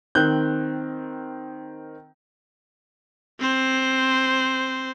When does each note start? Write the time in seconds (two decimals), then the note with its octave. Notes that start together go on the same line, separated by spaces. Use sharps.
0.15 D#3 C4 F#6 G6
3.40 C4 C5